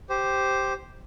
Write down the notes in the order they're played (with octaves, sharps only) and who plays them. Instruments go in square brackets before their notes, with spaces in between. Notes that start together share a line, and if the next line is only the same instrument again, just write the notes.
[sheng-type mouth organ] G4 C5